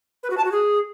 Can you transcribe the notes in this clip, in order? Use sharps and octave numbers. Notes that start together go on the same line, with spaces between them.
B4
F#4
A5
F#4
G#4